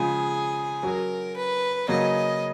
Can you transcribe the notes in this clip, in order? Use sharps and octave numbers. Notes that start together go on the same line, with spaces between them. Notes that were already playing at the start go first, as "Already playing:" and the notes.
Already playing: C#3 F3 G#3 G#4
F#3 C#4 F#4 A#4
B4
C#3 F#3 A#3 C#4 D#5